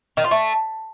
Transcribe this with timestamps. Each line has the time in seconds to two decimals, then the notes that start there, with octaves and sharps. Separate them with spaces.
0.17 D#3
0.24 F4
0.31 A3